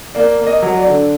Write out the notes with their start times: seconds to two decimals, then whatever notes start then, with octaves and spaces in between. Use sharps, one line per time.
0.15 A#3 D5
0.40 A#3
0.47 D#5
0.62 F#3
0.78 D5
0.86 D3